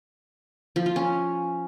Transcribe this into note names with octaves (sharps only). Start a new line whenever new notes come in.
F3
F4
C#4